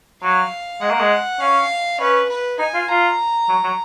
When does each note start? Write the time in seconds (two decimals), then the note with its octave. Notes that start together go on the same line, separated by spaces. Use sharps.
0.22 F#3 F5
0.81 G#3 F#5
0.90 A#3
1.00 G#3
1.40 C#4 F5
1.99 C#4 B4
2.29 B4
2.59 D#4 G#5
2.74 F4
2.88 F4 A#5
3.48 F#3
3.64 F#3